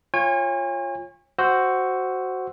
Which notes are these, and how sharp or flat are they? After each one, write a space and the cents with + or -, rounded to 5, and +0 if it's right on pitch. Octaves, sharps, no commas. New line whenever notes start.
F4 +0 C#5 -20 G#5 -40
F#4 +5 C5 +0 E6 +0